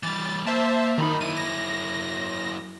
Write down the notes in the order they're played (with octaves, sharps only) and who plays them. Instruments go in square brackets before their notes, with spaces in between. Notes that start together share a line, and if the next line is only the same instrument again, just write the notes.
[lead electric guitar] E3 G3 [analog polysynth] A6
[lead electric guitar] A#3 [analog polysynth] C5 E5 A5
[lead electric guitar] F#2 B5 [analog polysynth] D#3 D#4
[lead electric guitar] F#2 E4 [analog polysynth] D#7
[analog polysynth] A#6